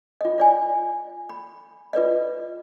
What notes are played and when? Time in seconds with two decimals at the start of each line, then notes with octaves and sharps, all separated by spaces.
0.21 F4 D#5
0.38 F4 D5 G#5
1.29 B5
1.93 F4 B4 D5 D#5